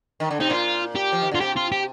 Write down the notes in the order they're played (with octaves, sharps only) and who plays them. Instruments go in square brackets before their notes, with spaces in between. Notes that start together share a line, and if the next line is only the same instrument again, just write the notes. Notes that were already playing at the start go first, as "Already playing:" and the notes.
[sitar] D#3
D3
[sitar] C3 [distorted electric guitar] D#4
[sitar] A#2 [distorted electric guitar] F4
[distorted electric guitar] G4
[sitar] F3
D#3
[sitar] D3 [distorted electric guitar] F4
[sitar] C3 [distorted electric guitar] G4
[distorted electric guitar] F4
G4